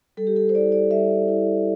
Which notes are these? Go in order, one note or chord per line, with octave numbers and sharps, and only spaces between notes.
G3 A4
G4
A4
C5
E4 D5
D5
G3 E5
E4